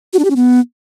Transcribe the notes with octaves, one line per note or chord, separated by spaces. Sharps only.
F#4
D4
G4
C#4
B3